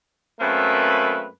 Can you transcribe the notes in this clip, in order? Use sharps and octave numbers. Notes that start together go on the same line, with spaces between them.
F#2 A3 A#3 C4 B4